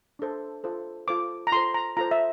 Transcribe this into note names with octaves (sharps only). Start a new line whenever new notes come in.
D4 A4 C5
F4 A4 C5
F4 A4 C5 D6
A#5
F4 A4 C5 C6
A#5
F4 A4 C5 A#5
E5